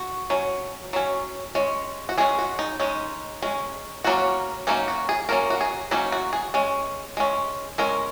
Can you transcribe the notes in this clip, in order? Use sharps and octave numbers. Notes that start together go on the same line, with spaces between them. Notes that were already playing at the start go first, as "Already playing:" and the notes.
Already playing: F#4
F#3 C#4
F#3 C#4
G#3 C#4
F#4
G#3 C#4 G#4
F#4
D#4
G#3 C#4 D#4
G#3 C#4
F#3 A#3 C#4 F#4
F#3 A#3 C#4 D#4
F#4
G#4
F#3 A#3 C#4 A#4
F#4
G#4
F#3 A#3 C#4 D#4
F#4
G#4
G#3 C#4
G#3 C#4
G#3 C#4 A#4